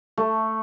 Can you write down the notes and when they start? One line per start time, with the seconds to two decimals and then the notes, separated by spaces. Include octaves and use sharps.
0.17 A3